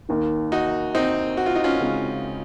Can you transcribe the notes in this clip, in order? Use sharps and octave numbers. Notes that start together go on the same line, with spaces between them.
D#2 D#3 A#3
D#4 F#4
C4 D#4
F#4
F4
D#4
C#4 F4
C#3 G#3 C4 F#4